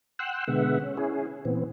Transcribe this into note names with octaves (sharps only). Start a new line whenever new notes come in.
F#5 G5 C6 E6 F#6
B2 D3 G#3 B3 E5 F#5
C#4
C#4 E4 G#4
A#2 E3 B3 C4